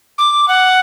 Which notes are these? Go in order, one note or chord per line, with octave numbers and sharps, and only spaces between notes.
D6
F#5